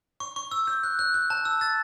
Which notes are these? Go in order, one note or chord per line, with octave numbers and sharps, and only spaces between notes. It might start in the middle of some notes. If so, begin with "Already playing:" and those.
C#6
C#6
E6
G6
F#6
F#6
F#6
A5
E6
A6